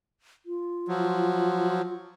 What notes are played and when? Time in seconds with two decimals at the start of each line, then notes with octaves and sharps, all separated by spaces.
0.46 F4
0.88 F3 F#3